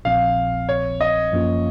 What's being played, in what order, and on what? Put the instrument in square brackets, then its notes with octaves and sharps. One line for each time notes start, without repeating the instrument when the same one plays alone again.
[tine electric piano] A#1 A#2 F3 C4 [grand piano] F5
[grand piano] C#5
D#5
[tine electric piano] F#2 F3 A#3 C#4 F4